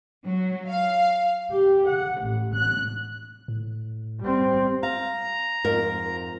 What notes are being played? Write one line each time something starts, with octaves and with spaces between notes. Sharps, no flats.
F#3
F5
G4
F#5
A1
F#6
A2
G3 C4
F5 A#5
F2 G#2 A#4